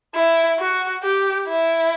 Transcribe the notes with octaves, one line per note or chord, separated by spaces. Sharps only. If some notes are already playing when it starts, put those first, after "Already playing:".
E4
F#4
G4
E4